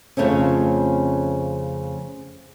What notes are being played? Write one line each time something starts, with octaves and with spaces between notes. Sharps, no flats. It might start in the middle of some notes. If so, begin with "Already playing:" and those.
F2 G#2 C#3 A3 C4 C#4